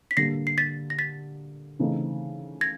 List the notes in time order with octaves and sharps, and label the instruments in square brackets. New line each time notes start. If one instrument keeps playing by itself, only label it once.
[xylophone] B6
[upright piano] D3 G3 A#3 [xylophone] A#6 C7
[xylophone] C7
A6 B6
A#6
A6 B6
[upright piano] C#3 E3 A3 C4 D#4
[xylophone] G#6 A#6